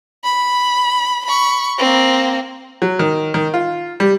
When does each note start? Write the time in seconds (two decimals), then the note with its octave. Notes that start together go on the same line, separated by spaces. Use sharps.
0.24 B5
1.26 B5 C#6
1.79 A#3 C4
2.82 F#3
2.99 D#3
3.34 D#3
3.54 F4
4.00 G3